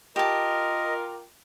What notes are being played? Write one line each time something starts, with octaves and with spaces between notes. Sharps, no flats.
F4 G4 A#4 D#5 A5